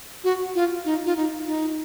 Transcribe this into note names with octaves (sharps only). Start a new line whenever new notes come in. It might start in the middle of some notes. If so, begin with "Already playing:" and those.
F#4
F4
D#4
F4
D#4
D#4